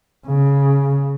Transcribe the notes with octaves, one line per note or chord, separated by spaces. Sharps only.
C#3